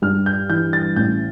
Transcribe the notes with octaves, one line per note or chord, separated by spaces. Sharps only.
G2 F6
G6
E3 G6
A6
A1 G6